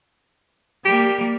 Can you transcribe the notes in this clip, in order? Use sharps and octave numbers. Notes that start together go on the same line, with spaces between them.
G3 A#3 G4